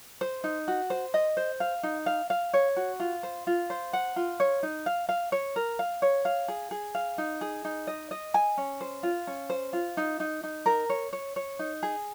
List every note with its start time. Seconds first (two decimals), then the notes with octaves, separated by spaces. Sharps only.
0.21 C5
0.44 D#4
0.68 F#4
0.90 C5
1.14 D#5
1.37 C5
1.60 F5
1.83 D#4
2.06 F5
2.30 F5
2.54 C#5
2.76 F#4
3.00 F4
3.23 C5
3.47 F4
3.70 C5
3.93 F#5
4.16 F4
4.40 C#5
4.63 D#4
4.86 F5
5.09 F5
5.32 C#5
5.56 A#4
5.79 F5
6.02 C#5
6.25 F5
6.48 G#4
6.71 G#4
6.95 F5
7.18 D#4
7.41 G#4
7.65 D#4
7.87 D#5
8.11 D#5
8.34 G#5
8.58 C#4
8.81 C5
9.03 F4
9.27 C#4
9.50 C5
9.73 F4
9.97 D#4
10.20 D#4
10.44 D#4
10.66 A#4
10.90 C#5
11.13 C#5
11.36 C#5
11.59 D#4
11.83 G#4